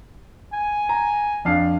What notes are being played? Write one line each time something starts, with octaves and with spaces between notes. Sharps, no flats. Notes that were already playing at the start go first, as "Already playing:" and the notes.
G#5
A#5
F2 D4 F5